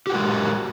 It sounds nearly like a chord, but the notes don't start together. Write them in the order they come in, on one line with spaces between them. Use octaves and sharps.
G4 F#4 A#4 G#3